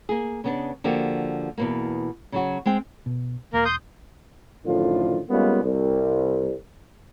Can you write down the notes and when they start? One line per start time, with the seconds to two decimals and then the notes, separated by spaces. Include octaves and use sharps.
0.09 A#3 G#4
0.44 C#3 B3 D4
0.84 D3 F3 A#3 F#4 G4
1.58 E2 B2 A#3
2.32 C#3 F#3 F#4
2.66 G#3 C4 G5
3.06 B2
3.53 E1 A#3 A#4
3.65 C6 D#6 G6
4.65 F#2 A2 D3 D#3 F3 F4
5.29 G3 G#3 A#3 B3 C#4 F4
5.62 C2